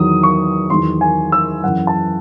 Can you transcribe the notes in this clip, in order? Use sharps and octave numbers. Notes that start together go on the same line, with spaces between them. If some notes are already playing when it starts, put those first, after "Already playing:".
Already playing: E2 D#3 F#3 D#6
C#6
E2 D#3 F#3 C6
G#5
E6
F#2 E3 F#5
A5